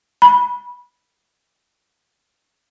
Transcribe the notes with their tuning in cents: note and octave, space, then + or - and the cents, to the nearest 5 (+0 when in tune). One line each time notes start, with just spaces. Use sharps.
B5 -15